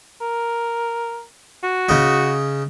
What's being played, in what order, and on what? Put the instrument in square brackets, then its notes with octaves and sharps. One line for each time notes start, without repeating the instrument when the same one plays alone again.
[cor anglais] A#4
F#4
[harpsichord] C#3 D#4